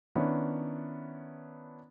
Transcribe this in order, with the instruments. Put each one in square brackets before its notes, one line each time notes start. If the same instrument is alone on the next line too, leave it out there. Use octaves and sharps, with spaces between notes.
[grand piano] D#3 B3 C#4 D4 E4